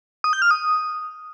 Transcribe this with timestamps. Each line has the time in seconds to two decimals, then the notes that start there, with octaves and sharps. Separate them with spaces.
0.24 D#6
0.33 G6
0.42 F6
0.51 D#6